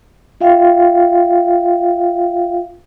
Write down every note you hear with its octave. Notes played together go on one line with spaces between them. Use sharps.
F4 E5 F5 G5